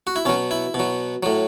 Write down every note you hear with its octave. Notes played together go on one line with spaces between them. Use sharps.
F#4
E4
B2 F#3 C#4
E4
B2
F#3
A2 F#3